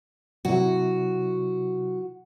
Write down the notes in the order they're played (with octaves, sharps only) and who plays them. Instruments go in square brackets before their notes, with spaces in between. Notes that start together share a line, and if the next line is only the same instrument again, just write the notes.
[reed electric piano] C3 F#3 E4 [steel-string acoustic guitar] F#4